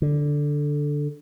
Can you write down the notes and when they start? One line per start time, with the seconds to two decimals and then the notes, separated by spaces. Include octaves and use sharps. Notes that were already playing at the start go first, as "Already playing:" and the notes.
0.02 D3